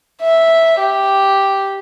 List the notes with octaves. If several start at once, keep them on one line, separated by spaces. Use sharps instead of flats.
E5
G4